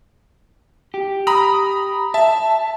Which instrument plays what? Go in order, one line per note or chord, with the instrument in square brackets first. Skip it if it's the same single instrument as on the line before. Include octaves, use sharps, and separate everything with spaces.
[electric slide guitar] G4
[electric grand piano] A#5 B5 D#6
[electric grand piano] E5 [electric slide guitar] A5